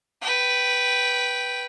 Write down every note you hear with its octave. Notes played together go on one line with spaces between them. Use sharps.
B4 G5